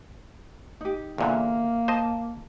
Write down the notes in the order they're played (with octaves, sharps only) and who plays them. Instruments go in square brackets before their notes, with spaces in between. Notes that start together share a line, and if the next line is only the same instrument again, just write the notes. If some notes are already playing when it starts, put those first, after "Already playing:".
[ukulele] D#4 G4
[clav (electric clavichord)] E2 A#2 D3 [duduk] A#3 [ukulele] A#4 C5 E5
[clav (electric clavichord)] C5 D#5 [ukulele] A5